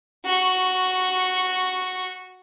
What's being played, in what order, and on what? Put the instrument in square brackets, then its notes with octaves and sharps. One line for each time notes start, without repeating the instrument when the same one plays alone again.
[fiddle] F#4 C#6